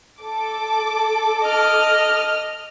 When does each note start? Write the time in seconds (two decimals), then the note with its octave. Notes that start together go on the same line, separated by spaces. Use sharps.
0.22 A4 D6
1.43 D#5 F6